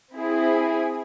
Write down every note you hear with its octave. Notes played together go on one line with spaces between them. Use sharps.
C4 E4 G#4